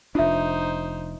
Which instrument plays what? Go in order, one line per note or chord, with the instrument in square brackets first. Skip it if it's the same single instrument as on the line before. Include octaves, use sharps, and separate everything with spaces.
[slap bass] F1 D4 [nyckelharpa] D#4 C5 [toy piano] F4 E5